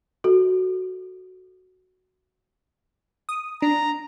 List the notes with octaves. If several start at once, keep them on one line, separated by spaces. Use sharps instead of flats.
F#4 A4
D#6
D4 A#5